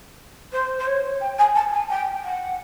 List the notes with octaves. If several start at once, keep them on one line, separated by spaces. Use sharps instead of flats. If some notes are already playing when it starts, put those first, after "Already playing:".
C5
C5
C#5
G5
G#5
A5
G#5
G5
F#5